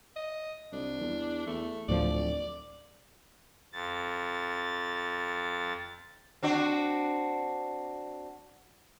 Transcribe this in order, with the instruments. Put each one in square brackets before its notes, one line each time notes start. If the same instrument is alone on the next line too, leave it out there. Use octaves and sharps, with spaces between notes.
[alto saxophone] D#5
[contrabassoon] C2 [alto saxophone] D4
[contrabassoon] E2
[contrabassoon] E2 [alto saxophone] A3
[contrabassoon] D1 [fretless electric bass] D2 A2 F3 [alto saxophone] D5
[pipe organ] F2 A6
[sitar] C4 D4 F#4